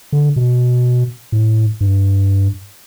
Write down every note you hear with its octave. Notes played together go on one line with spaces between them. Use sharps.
D3
B2
A2
G2